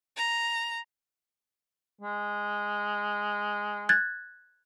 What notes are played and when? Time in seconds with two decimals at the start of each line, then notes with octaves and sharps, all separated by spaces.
0.16 A#5
2.01 G#3
3.89 F#6 G#6 A6